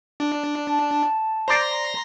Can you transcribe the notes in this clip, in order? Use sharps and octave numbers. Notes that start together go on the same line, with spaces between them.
D4
A5
C5 D5 A#5 C6 A#6